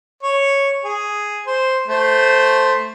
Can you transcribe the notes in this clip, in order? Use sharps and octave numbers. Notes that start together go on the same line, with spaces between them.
C#5
G#4
C5
A3 C5